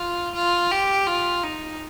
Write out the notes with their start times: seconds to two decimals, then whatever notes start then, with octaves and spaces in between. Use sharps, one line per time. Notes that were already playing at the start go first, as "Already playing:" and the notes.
Already playing: F4
0.34 F4
0.72 G4
1.07 F4
1.44 D#4